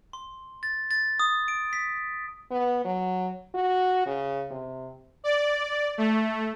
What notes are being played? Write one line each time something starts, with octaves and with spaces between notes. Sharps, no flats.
C6
A6
A6
D#6
D7
B6
B3
F#3
F#4
C#3
C3
D5
A3